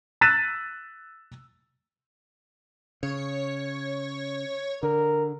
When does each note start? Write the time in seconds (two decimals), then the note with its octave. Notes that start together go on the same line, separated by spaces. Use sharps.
0.21 E6 F#6 A6 B6 D#7 E7
3.03 C#3 C#5
4.83 D3 A#4